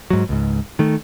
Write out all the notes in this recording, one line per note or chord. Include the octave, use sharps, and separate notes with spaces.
G#2 F#3
C#2 G#2
D#3 A3